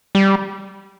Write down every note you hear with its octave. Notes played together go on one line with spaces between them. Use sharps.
G3